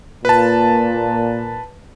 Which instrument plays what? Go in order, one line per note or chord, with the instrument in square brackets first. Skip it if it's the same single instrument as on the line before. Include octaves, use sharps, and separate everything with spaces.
[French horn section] A#2 [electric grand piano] B4 A5